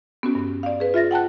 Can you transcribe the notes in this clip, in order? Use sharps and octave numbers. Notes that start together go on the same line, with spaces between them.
B3 C#4 F#4
G2 B3
D5 F5
G#4 B4
F4 E5 A6 A#6
F#5 G5 A5 F#6